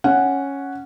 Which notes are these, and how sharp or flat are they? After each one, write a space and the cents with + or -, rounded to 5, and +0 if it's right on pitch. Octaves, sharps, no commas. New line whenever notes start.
C#4 +0 F#5 +0